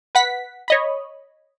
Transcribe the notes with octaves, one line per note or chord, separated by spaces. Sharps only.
B4 F#5 B6
C#5 D#5 B5